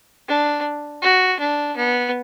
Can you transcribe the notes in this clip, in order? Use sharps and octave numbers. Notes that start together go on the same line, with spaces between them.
D4
F#4
D4
B3